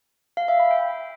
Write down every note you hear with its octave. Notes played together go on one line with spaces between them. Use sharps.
F5
E5
B5
G5